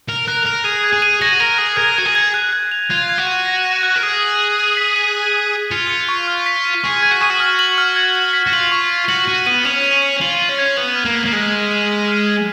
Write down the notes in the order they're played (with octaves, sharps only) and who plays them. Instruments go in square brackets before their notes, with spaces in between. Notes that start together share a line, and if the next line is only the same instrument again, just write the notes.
[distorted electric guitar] A#4 [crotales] F7
[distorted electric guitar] A#4 [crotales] F#6
[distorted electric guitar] A#4 [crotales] F7
[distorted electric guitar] G#4 [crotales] D#7
[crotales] G#6
[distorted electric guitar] G#4
[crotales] D#7
[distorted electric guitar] F#4 [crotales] A#6
[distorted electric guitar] A#4 [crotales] A#6
[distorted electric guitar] G#4 [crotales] A#6
[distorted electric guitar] A#4 [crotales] G#6
[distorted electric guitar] F#4 [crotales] G#6
[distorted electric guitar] G#4
[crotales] G#6
F#6
F#6
F7
[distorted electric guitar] F4 [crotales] G#6
[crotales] G#6
[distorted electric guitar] F#4
[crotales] D#7
A#6
A#6
F#6
[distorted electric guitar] A#4
[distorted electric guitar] G#4 [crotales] D#7
[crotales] F#7
F#7
D#7
B6
D#7
G#6
G#6
D#7
[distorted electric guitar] F4 [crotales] C#7
[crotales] C#7
C#6
F6
B6
D#7
[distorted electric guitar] G#4 [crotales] C#6
[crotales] G#6
[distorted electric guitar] F#4
[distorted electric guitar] G#4 [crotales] C#6
[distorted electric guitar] F#4
[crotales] F6
F#7
F6
G#6
F#7
B6
[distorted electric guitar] F#4
[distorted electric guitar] F4 [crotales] F#7
[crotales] C#6
F#7
[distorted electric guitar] F#4 [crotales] F#7
[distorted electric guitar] F#4 [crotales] D#7
[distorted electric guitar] B3 [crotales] D#7
[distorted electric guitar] C#4 [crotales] F7
[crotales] F7
F7
[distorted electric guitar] F4 [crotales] F#7
[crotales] F#7
[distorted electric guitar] C#4
[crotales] G#6
[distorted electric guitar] B3 [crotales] F#7
[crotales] F6
[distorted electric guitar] A#3
[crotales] B6
[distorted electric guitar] A#3
[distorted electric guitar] G#3 [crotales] F#7
[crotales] D#7
D#7
B6
F6
G#6